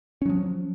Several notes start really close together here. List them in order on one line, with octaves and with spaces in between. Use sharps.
C#4 F#3 F3